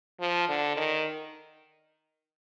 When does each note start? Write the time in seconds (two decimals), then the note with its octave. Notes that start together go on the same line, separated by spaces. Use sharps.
0.20 F3
0.49 D3
0.77 D#3